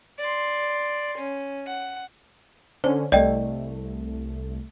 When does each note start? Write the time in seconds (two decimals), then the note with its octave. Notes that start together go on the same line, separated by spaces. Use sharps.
0.19 D5 C6
1.18 C#4
1.67 F#5
2.84 D3 C#4 C5
3.12 C2 A3 D5 D#5 G5